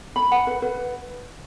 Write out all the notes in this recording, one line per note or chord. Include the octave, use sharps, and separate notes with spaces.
B5
F#5
B4
B4